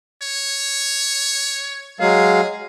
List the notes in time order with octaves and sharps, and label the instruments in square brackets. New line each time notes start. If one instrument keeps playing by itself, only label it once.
[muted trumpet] C#5
[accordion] F#3 G#3 F5 [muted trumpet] G#4